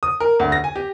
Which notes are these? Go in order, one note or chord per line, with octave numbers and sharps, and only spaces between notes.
D#6
A#4
D2
A#6
G#5
G4